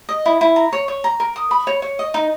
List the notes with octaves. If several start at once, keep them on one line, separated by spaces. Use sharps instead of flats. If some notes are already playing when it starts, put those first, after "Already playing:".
D#5
E4
E4
A#5
C#5
C#5
A#5
A#4
D#6
B5
C#5
C#5
D#5
D#4